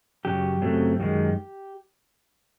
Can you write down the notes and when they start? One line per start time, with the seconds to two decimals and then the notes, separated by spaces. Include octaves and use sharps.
0.25 F#2 C#3 F#3 G4
0.61 F#2 C#3 F#3 A3 C4
1.00 F#2 D#3 G#3